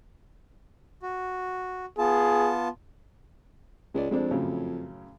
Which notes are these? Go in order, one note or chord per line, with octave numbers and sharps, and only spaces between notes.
F#4
B3 F4 G#4 A5
C#2 G#3 D5
F2 G#3 C4 D4
F#2 A2 C#3